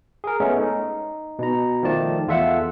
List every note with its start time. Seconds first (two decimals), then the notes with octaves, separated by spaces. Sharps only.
0.24 G#4 A#4
0.40 G#3 A3 B3 C#4 A4
0.57 D#4
1.39 B2 A#5
1.83 D#3 F3 A3 D5 A5
2.28 E2 F4 A4 E5 F#5 E6